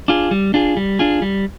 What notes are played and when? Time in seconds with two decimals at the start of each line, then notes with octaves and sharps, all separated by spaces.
0.08 D4 F4 G#4
0.31 G3
0.54 D4 F4 G#4
0.77 G3
0.99 D4 F4 G#4
1.22 G3